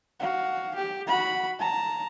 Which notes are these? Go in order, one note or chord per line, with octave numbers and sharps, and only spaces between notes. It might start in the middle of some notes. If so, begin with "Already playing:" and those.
F#4 F5
G4
F#4 B5
A5 A#5